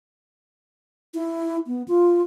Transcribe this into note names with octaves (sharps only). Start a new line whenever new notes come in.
E4
B3
F4